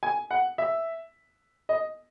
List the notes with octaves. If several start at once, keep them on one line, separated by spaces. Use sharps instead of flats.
G#5
F#5
E5
D#5